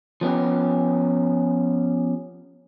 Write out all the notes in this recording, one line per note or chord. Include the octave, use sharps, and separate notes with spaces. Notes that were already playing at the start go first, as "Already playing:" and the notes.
F3 B3 C#4 G4